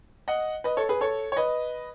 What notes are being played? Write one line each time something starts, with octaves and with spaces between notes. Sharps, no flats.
D#5 F#5
B4 D#5
A4 C#5
G#4 B4
A4 C#5
C#5
B4 D#5